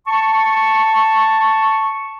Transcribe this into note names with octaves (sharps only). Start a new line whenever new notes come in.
A5 C#6